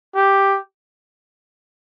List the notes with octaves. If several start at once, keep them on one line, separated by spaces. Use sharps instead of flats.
G4